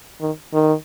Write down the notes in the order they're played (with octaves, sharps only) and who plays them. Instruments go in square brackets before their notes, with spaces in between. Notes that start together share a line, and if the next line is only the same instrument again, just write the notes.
[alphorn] D#3
D#3